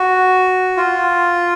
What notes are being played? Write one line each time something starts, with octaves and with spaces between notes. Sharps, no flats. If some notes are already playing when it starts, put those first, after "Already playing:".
Already playing: F#4
F4